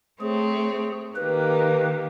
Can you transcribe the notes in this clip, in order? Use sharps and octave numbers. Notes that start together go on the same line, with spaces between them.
A3 C4 G#4 C#5
D#3 A#3 G4 B4